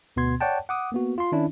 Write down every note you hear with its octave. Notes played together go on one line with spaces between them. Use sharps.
D2 B2 B3 C6 G#6
C#5 D5 F#5 G5 A5
F#5 D6 D#6
A#3 B3 F#4
F4 C6
D#3 C#4 D4 E4